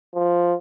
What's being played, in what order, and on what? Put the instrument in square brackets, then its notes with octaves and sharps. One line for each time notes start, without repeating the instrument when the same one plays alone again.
[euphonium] F3